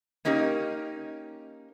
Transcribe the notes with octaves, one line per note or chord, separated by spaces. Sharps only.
A#3 C#4 D#4 G4 A#4